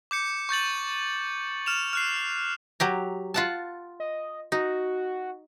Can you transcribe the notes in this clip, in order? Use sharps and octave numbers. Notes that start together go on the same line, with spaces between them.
D6 G6 C#7
C#6 G6 A6 F#7
F6 E7 F7
F6 F#6 C7
F#3 G4 A#5
F4 F#5 A5
D#5
D#4 F#4